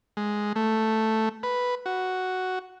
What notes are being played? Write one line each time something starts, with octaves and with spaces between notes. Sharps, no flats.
G#3
A3
B4
F#4